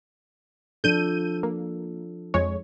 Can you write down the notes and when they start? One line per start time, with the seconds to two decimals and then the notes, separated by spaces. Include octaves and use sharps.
0.84 F3 D4 A4 G6 D#7
1.43 A#3
2.34 F2 G#3 C#5